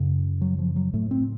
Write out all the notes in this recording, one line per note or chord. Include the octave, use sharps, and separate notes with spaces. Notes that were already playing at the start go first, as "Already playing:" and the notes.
Already playing: F#2 C#3
F#3
F3
F#3
A2 A3
C4